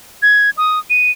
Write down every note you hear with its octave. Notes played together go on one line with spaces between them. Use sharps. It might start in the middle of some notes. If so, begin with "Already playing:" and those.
G#6
D#6
D#7